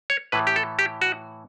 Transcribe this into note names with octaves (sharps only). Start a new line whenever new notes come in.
C#5
A2 E3 B4
G4
A4
G4
F#4